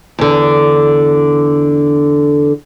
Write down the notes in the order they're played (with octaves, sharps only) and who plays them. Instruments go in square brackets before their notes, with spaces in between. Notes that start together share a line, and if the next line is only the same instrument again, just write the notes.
[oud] E2 D3